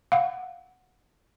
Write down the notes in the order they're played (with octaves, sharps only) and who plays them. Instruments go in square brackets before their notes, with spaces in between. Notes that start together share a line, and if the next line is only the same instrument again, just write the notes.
[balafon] F5 F#5